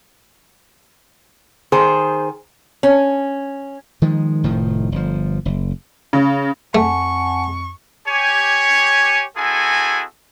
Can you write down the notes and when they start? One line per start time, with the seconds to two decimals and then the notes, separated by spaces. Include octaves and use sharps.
1.72 D#3 G#4 C5
2.83 C#4
4.02 D#3 F3 G#3
4.44 F1 A2 D#3 F3
4.92 G1 F3
5.45 F#1
6.13 C#3
6.75 F2 A3 F#5 G#5 A5 C#6
8.07 G4 C#5 G#5
9.37 C4 E4 F#4 G#4 A4 G#5